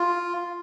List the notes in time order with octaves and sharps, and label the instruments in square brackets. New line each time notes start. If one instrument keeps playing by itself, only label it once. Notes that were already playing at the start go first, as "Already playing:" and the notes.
Already playing: [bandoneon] F4